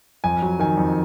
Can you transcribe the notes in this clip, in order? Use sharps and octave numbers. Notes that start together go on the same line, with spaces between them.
F2 G#5
F#3
D#3 G#5
F2